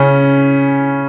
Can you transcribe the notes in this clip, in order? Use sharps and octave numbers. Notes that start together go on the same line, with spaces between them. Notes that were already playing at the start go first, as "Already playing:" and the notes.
Already playing: C#3 C#4